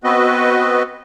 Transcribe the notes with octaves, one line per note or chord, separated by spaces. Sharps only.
B3 C4 F#4 B4 D#5